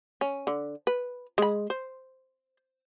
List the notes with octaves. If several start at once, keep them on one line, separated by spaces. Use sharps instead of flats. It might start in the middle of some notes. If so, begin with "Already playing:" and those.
C#4
D3
B4
G#3 B5
C5